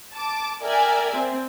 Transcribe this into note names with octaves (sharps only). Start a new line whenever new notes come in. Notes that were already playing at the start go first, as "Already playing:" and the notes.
A5 D6
A#4 D5 E5 G5 G#5
C4